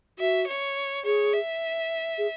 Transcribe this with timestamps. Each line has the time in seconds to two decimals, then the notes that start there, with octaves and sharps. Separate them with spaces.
0.19 F#4 E5
0.47 C#5
1.05 G#4 C#5
1.33 E5
2.18 G#4